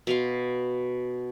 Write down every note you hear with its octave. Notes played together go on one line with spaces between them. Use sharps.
B2 F5 C6